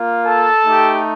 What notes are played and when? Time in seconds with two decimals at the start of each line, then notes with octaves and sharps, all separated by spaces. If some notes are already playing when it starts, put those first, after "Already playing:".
Already playing: A#3 F4
0.23 A4 A5
0.64 A3 D#4 G4